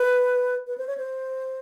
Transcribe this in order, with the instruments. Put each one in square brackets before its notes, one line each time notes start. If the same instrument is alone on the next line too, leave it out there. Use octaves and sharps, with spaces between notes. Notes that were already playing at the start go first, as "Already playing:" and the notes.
Already playing: [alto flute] B4
B4
C5
C#5
C5